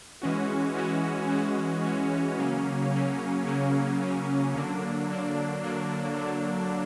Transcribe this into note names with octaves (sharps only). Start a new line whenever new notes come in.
E3 G#3 C#4 F#4
E3 G#3 C#4 F#4
E3 G#3 C#4 F#4
E3 G#3 C#4 F#4
C#3 F#3 A#3 C#4
C#3 F#3 A#3 C#4
C#3 F#3 A#3 C#4
C#3 F#3 A#3 C#4
D3 F#3 A#3 D4
D3 F#3 A#3 D4
D3 F#3 A#3 D4
D3 F#3 A#3 D4